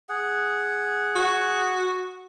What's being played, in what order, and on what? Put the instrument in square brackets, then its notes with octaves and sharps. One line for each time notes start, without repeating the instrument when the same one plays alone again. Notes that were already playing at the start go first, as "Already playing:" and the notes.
[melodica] G#4 F#5
[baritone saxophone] F#4